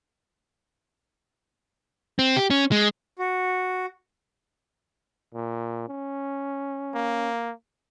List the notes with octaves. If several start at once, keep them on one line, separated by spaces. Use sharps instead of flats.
C4
G4
C#4
G#3
F#4
A#2
C#4
A#3